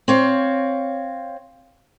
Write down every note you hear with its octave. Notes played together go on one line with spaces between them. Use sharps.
C4 C#5 F5